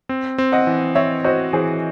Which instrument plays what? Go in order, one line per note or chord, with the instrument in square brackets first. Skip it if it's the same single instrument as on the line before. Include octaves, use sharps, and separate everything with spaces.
[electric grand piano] C4
C4
[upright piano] D#5 F#5
[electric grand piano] E3
[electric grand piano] C4 [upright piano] C#5 E5
[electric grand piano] F#4 [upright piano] C5 D#5
[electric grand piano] E3 [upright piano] G#4 C5